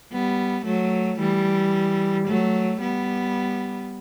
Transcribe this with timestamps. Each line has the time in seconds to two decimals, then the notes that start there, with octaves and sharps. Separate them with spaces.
0.12 G3 B3
0.65 F#3 A3
1.19 E3 G3
2.27 F#3 A3
2.80 G3 B3